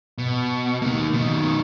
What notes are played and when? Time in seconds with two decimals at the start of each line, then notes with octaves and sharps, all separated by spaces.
0.18 B2
0.82 D#3 A#3
1.13 B2 D#3